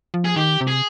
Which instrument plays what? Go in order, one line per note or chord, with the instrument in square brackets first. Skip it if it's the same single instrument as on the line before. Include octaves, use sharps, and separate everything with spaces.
[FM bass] F3
[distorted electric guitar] G#4
[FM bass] D#3 [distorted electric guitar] G4
[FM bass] C3
[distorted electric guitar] G#4